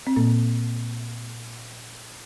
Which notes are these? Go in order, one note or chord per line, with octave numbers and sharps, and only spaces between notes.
C4
A#2 A#3